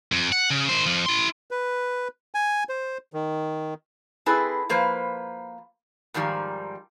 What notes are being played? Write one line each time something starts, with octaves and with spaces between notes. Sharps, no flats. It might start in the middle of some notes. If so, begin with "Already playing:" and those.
F2
F#5
C#3
D#3 C5
F2 F3
E4 C6
B4
G#5
C5
D#3
C4 E4 G#4 A4 B4
F3 A#3 B4 C5
G#2 D#3 F3 G3